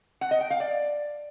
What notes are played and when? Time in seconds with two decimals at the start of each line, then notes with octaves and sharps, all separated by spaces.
0.21 F#5
0.31 D#5
0.41 G5
0.50 F5
0.60 D5